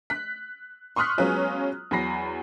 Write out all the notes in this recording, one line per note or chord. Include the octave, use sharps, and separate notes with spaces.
F#6 B6
C6 C#6 D#6 F6 F#6 B6
F#3 G#3 B3 C#4 F4
E2 F#3 G#5 B5 A#6 C7